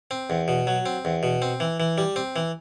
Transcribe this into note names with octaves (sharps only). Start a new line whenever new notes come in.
C4
E2
B2
F#3
C4
E2
B2
C4
E3
E3
G3
C4
E3